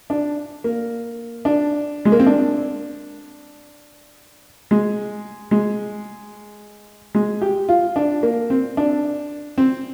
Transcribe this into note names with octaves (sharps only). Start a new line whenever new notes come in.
D4
A#3
D4
G#3
A#3
C4
D4
G#3
G#3
G#3
G4
F4
D4
A#3
C4
D4
C4